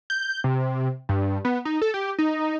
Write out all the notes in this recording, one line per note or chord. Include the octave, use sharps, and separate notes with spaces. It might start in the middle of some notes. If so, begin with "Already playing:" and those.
G6
C3
G2
B3
D#4
A4
G4
D#4